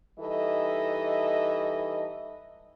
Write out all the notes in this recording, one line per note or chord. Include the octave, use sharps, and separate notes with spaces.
E3 G3 D#4 E4 A4 D#5